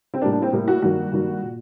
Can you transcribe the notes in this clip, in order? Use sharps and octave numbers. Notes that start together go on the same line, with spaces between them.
C4
A2 G3 A#3 D4
D4
C4
A2 G3 A#3
F#4
G2 D#3 F#3 A#3 F#4
G2 D#3 F#3 A#3
A#2